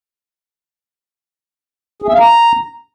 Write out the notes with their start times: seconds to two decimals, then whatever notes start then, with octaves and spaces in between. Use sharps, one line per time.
2.02 G#4
2.08 E5
2.14 F5
2.20 A#5